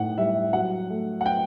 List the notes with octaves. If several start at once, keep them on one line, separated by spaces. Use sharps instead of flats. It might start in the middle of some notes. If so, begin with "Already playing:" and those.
Already playing: A2 D#4 F#5
G3 E5
F#3 F#5
A3
F#5
G5